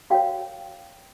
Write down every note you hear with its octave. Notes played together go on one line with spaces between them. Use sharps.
F#4 A#4 C#5 F5 G5